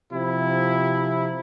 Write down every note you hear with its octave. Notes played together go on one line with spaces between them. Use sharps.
C3 F3 E4